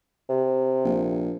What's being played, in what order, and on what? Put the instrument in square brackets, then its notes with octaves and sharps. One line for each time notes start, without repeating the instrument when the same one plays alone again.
[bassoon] C3
[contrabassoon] A#1